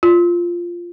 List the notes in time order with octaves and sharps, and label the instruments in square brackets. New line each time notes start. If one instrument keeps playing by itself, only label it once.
[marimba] F4